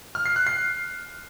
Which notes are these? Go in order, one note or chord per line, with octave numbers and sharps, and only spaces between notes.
F6
C7
F#6
C7